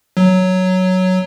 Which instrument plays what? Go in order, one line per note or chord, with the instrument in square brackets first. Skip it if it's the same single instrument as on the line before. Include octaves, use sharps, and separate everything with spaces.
[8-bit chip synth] F#3